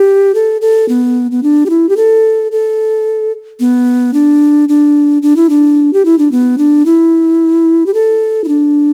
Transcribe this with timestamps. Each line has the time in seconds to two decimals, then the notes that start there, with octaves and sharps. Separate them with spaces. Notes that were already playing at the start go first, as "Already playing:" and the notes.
Already playing: G4
0.35 A4
0.61 A4
0.89 B3
1.32 B3
1.43 D4
1.66 G4
1.70 E4
1.89 G4
1.97 A4
2.52 A4
3.60 B3
4.14 D4
4.69 D4
5.22 D4
5.36 E4
5.50 D4
5.93 G4
6.05 E4
6.18 D4
6.32 B3
6.58 D4
6.86 E4
7.86 G4
7.94 A4
8.44 E4
8.48 D4